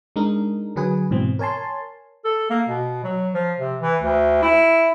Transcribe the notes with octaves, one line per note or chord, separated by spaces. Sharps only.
G#3 D4 D#4 A#4
D3 F#3 G#4 B4 G#5
G#2 B2 E3 C4
A#4 C#5 G#5 A5 C6
A4
A#3
B2
F#3
F3
C3
E3
D2
E4